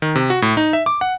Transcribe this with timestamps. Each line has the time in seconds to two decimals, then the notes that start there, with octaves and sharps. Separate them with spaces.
0.02 D#3
0.16 C3
0.30 F#4
0.42 A2
0.57 D#4
0.73 E5
0.86 D6
1.01 F#5